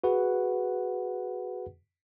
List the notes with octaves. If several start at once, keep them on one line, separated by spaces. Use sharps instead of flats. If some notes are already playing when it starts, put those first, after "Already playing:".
F#4 G#4 B4 F#5